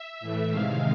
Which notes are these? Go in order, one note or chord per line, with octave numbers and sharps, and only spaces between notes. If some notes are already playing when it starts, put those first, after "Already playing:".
Already playing: E5
A2 E3 A3
C3 D#3 G#3 F5